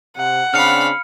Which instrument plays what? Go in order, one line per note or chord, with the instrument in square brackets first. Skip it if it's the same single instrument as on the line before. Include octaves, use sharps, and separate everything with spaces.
[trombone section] C3 [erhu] F#5
[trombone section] C#3 C4 D4 [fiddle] F5 B5 [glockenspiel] F6 C#7